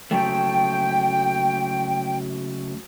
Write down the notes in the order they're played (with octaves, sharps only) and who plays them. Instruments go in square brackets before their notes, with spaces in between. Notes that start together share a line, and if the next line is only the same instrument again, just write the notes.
[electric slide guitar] C#3 F#3 A3 [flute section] G5